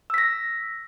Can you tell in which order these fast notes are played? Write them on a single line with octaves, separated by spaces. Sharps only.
E6 B6 A#6